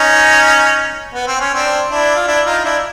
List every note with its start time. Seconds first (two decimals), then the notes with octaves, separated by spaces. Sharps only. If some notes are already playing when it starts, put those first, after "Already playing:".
Already playing: C#4 D#4
1.14 B3
1.27 C4
1.40 C#4
1.54 C4 D4
1.90 D4 E4
2.16 F4
2.27 D4 E4
2.46 D#4 F4
2.64 D4 E4